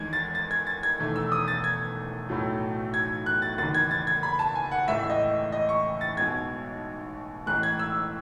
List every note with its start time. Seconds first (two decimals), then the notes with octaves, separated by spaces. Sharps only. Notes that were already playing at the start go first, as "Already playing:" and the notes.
Already playing: E2 D#3 G#3 G#6
0.13 A6
0.35 A6
0.51 G#6
0.67 A6
0.83 G#6
0.99 E1 E2 D#3 A3
1.16 E6
1.32 D#6
1.48 A6
1.64 G#6
2.29 B1 A2 F#3 A3
2.94 G#6
3.26 F#6
3.42 A6
3.58 F#1 E2 D#3 A6
3.74 G#6
3.91 A6
4.07 G#6
4.23 B5
4.39 A5
4.55 G#5
4.72 F#5
4.88 A1 A2 E3 G#3 E5
5.10 D#5
5.52 D#5
5.69 C#6
6.01 A6
6.17 B1 B2 G#3 G#6
7.46 A1 A2 G#3 F#6
7.63 G#6
7.79 E6